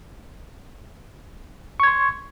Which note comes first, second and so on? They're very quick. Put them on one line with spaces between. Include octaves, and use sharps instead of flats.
C#6 G#6 C6